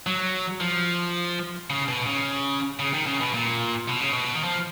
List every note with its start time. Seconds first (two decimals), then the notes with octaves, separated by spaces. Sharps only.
0.06 F#3
0.61 F3
1.70 C#3
1.88 B2
2.06 C#3
2.79 C#3
2.93 D#3
3.07 C#3
3.20 B2
3.34 A#2
3.88 B2
4.01 C#3
4.12 B2
4.35 D#3
4.44 F3